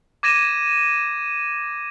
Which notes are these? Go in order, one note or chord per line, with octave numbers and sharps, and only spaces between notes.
D6 G#6 A#6 D#7 E7